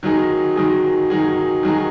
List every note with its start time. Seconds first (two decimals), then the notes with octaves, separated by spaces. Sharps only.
0.03 D#3 F#3 D#4 G#4
0.56 D#3 F#3 D#4 G#4
1.10 D#3 F#3 D#4 G#4
1.63 D#3 F#3 D#4 G#4